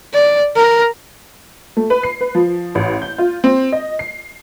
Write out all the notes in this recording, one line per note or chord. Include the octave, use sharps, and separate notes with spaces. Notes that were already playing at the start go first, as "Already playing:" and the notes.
D5
A#4
A3
B4
C7
B4
F3
A1
G6
F4
C4
D#5
C7